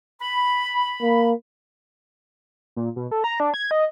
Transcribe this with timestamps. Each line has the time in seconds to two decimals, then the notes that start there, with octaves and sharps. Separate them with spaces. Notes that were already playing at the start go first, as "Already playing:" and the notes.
0.21 B5
1.02 A#3
2.76 A#2
2.96 B2
3.11 A4
3.24 A#5
3.40 D4
3.54 G#6
3.71 D#5